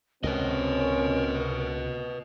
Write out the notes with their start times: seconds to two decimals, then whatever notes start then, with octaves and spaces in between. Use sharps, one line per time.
0.24 C#2 C3 C4 C#4 A#4 B4 D#5